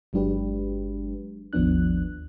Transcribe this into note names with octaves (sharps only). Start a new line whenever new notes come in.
G1 F#3 G#3 D4 G4 B4
G#1 D#2 F3 B3 D4 F#6